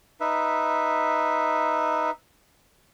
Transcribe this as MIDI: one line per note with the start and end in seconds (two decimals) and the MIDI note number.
0.20 2.11 63
0.20 2.11 71
0.20 2.11 76